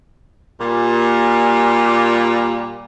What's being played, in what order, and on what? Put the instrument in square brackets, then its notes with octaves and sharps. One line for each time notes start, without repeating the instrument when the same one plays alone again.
[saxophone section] A#2 G3